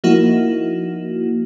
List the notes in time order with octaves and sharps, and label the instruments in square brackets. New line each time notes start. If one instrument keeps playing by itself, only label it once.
[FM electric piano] F3 A#3 D#4 E4 F#4